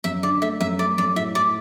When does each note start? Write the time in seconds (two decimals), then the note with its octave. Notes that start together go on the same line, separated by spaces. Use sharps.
0.04 F#2 E5
0.23 D3 D5
0.42 A3 E5
0.60 F#2 E5
0.79 A3 D5
0.98 F#2 D5
1.16 A2 E5
1.35 A2 D5